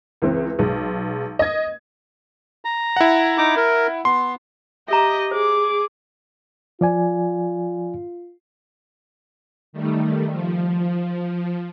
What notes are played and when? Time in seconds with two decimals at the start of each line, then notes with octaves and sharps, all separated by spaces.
0.22 C#2 E3 C4
0.59 B1 G#3
1.39 D#5 G#6
2.65 A#5
2.96 E4 F#5
3.38 D#4 A#5 D6
3.57 A#4
4.05 B3 C6
4.88 G4 D#5 E5 A#5
5.31 G#4 C5 D6
6.81 F3 F4 D5 G#5
9.73 D#3 G3 A3
10.31 F3